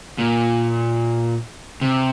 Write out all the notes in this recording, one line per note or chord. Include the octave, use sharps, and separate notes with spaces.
A#2
C3